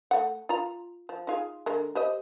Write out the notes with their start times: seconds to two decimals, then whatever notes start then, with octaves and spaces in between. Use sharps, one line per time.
0.11 A3 F#5
0.49 F4 A#5
1.09 F3
1.27 D#4 F4 G#4
1.66 D3 G#3 A#4
1.95 G4 C5 D#5